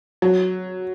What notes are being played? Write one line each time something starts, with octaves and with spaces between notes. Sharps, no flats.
F#3